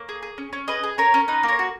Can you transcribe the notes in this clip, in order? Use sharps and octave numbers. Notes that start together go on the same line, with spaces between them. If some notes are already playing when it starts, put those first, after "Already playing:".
Already playing: A#3 C#5
G#4
G#4
C#4
C#4
G#4 B4 D#5
G#4
C#4 A#4 C#5
C#4
D#4 B4
A#3
A#4 C#5
F#4